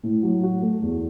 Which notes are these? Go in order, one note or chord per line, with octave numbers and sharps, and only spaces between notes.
A2
F#3
F#4
A3
E2